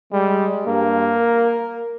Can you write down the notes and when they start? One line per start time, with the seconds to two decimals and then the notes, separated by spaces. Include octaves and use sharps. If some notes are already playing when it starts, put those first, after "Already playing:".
0.12 G3 G#3
0.67 G2 A#3
1.17 A#4